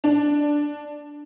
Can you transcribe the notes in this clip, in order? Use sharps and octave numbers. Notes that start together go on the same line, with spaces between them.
D4